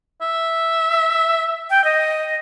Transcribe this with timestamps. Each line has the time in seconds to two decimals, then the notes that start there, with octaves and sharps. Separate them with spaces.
0.22 E5
1.70 G5
1.84 D#5